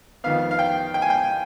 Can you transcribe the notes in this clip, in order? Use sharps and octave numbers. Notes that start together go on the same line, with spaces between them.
F2 D#3 B3 F5
F5
G5
G5
G#5
G5